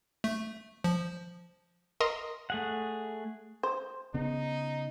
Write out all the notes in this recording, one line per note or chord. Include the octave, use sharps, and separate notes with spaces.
A3
F3
A#4 D#5 C6
A3 G#4 F#5
C5
C#3 B3 D#4